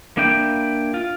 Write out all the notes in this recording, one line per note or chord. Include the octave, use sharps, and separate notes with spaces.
A#3 D4 E4 G5
F4